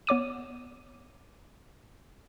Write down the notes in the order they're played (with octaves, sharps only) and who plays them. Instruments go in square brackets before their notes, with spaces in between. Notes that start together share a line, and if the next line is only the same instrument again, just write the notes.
[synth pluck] B3 C#5 D6 D#7